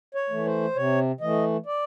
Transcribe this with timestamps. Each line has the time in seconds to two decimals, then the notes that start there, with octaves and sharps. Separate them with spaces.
0.15 C#5
0.30 E3 A3
0.45 C5
0.75 C3 C#5
1.21 E3 A3 D#5
1.66 D5